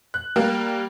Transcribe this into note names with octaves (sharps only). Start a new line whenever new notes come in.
F#6
G3 A#3 A#4